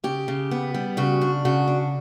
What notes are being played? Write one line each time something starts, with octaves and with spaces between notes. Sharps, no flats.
C#3 G4
C#3
B3
G3
C#3 F#4
D4
C#3 F#4
D4